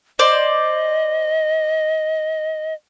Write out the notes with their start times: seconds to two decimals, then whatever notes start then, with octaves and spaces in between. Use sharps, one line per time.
0.19 C5 D5 D#5